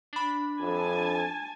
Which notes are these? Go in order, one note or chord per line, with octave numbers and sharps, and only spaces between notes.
D4 B5
F2 G#5 A5